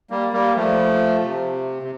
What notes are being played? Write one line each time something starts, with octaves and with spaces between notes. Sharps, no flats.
G3 A#3
G3 A#3
F3 A3
C3
C3